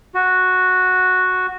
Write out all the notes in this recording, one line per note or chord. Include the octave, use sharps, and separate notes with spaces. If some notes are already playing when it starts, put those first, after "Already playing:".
F#4